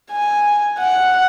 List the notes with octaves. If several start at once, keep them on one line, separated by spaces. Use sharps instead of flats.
G#5
F#5